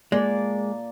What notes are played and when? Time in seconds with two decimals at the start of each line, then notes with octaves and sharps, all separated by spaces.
0.12 G#3 A#3 D5